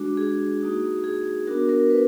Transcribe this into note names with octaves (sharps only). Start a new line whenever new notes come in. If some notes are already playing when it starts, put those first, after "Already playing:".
Already playing: G#3 D4 F#4
G#4
A#3 D#4 F#4
G#4
B3 D4 F#4 A#4
A#4
B4